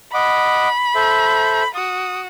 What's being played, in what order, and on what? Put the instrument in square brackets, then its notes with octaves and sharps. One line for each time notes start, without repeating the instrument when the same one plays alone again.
[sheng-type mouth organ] D#5 F#5 D6 [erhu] B5
[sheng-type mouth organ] A4 C5 E5
[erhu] F#4 [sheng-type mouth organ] D#6